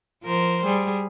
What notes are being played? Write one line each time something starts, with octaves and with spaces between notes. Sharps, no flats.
F3 A#4 C5
G3 G#4